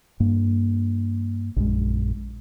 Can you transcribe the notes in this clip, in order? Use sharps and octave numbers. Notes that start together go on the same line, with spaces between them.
G2 A#3
A#1 F#2 G#3